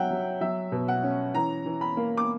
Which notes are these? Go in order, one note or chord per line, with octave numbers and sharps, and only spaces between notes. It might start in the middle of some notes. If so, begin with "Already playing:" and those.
Already playing: F#3 E5 F#5 G5
F#3
F#3 E5
B2
F#5
C#4
E3 A#5
E3
B5
A#3
D6